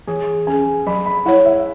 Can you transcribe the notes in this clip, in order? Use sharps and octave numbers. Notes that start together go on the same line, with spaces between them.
E3 G#4
C#4 G#4 G#5
F#3 B5
B5
E4 C#5 F#5
E5